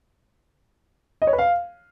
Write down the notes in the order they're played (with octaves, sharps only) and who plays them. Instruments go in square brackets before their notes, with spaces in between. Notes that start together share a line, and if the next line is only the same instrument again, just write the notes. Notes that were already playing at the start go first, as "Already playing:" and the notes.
[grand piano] D#5
C#5
B4
F5